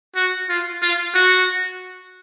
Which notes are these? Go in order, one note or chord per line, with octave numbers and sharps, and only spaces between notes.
F#4
F4
F4
F#4